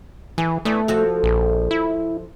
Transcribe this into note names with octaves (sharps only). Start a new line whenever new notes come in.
E3 G#4
E3 A3 B3 D4
F3 F#4 A4
A#1
E4